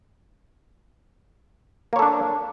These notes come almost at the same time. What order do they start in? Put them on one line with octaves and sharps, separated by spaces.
A#3 C#5 A4 D4